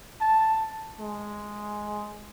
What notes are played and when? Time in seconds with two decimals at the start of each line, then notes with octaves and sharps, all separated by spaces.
0.21 A5
1.00 G#3